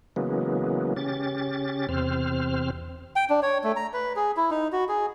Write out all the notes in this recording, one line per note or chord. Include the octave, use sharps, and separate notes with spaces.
C#3 E3 F#3 G#3 A#3 B3
C#3 C#4 G4 A6
E2 C3 C4 C5 F6
G5
D4
C#5
A3
A#5
B4
G#4
E4
D#4
F#4
G#4